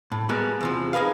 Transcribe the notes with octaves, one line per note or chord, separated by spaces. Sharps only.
A2
G3 G#3 A#3 B3 F#4 A#4
E2 C3 F3
D#4 G#4 A#4 B4 F5